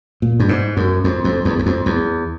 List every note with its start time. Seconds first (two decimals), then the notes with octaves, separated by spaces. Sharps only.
0.22 A#2
0.40 G2
0.49 G#2
0.77 F#2
1.04 F2
1.24 F2
1.45 E2
1.59 E2
1.66 F2
1.86 E2